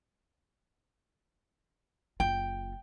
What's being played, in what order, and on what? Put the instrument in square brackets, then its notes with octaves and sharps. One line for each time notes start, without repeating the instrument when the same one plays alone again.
[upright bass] F#1 F4 [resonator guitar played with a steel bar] G5